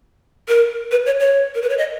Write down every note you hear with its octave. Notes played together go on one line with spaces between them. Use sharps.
A#4
B4
C#5
C#5
A#4
B4
C#5
D#5